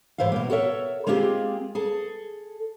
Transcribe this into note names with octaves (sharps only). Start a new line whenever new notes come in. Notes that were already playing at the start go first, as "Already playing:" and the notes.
G#2 E3 C5 E5 F5
B2 A#3
F#4 A4 A#4 C#5 E5
G#3 A#3 C4 F4 G4 G#4
G#4 A4 A5